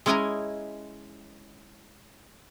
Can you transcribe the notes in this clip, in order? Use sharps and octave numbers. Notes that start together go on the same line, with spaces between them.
G#3 C#4 E4 D#5 G#5 A#5